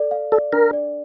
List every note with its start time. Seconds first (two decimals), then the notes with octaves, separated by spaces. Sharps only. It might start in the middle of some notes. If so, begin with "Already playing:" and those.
Already playing: A4 D5
0.11 F5
0.32 A4 D5
0.53 D4 A#4
0.73 D5